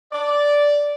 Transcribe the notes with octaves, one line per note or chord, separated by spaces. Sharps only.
D5